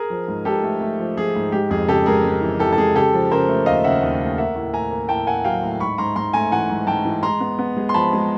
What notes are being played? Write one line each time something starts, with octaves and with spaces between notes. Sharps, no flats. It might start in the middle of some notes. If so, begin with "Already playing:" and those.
Already playing: G#4 A#4
F3
G#2
G#2 G4 A4
A3
A3
F3
F3 G#4
G#2
G#3 G4
F2 G#4
C#3 G4 A4
G#3 G#4 A#4
G#3
E3
E3 G4 A4
A4
G#3 G#4
C#3 G4 A4
F3
C#3 A#4 C5
A3
D#2 D#5 F5
C#3 E5 F#5
D#2
A3
A#3 E5 F#5
A2
A2 G#5 A#5
A#3
A2 G5 A5
A#3 F#5 G#5
F#3 F5 G5
A2
G#2 B5 C#6
G#2 A#5 C6
G#2 A#5 C6
A3 G#5 A#5
E3 F#5 G#5
G#2
G#2 G5 A5
E3
G#3 A#5 C6
B3
B3
G#3
C6
F3 A5 B5
G#3